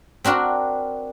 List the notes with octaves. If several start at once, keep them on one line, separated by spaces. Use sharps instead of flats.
C4 D4 F#4 A#4